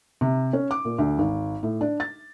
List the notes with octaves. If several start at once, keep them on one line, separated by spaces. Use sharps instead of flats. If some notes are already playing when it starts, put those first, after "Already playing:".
C3
C#4
D6
A#2
D2
G#1
A2
D4
A6